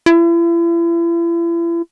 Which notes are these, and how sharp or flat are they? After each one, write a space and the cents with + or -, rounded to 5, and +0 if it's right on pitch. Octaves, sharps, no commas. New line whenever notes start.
E4 +40